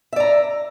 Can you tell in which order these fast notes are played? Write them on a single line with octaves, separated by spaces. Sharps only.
E5 D5 A#5